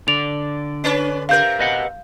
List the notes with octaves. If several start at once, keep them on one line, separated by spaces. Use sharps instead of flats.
D3 D5 F7
C#4 D4 B4
C3 A#4 F5 G6
B4 D#5 F#5